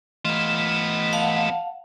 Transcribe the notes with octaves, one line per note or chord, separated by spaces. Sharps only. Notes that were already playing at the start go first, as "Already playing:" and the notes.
E3 A3 B3 F4 D#5
F5 F#5 A5